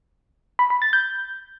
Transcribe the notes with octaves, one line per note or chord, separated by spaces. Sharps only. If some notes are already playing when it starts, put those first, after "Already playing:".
B5
B5
A6
G6